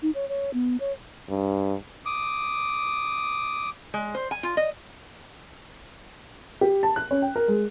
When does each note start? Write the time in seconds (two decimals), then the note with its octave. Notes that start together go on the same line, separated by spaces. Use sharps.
0.02 D#4
0.15 C#5
0.29 C#5
0.53 B3
0.80 C#5
1.29 G2
2.06 D6 D#6
3.94 G#3
4.15 C5
4.31 G#5
4.43 F4
4.57 D#5
6.61 G4
6.83 A5
6.96 F#6
7.11 C#4
7.22 G5
7.36 A#4
7.48 G#3